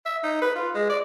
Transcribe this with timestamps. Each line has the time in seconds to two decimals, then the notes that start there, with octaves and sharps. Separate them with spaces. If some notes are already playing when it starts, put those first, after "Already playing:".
0.06 E5
0.24 D#4
0.42 B4
0.56 F4
0.75 G#3
0.90 D5